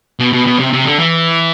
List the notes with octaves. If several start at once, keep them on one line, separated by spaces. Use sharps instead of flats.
B2
B2
B2
C3
C3
D3
E3